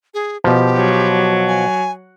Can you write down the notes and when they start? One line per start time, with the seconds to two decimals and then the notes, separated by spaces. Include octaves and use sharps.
0.14 G#4
0.44 B2 F3 G4
0.77 F#3
1.48 G#5